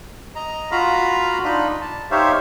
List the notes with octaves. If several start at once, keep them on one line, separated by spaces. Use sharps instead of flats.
D#5 A#5
F4 F#4 F5 A#5 B5
D4 D#4 F4 D#5 B5
A5
D#4 G4 C5 C#5 E5 F5